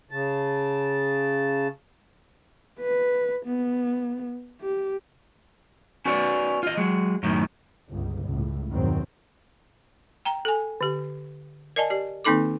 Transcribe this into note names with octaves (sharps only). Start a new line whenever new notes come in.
C#3 A5
B4
B3
G4
C#4 F#4 B4 C#5 D5
F4 D#5
F#3 G#3
F#2 A2 D#3
G1 C#2
C#2 A2
E2 G2 B2 D#3 F#3 C4
G5 A#5
A4 G#5
D3 G4
A#4 D5 D#5 G#5 A5
G4 D5
D#3 A#3 C4 D#4 A4 D6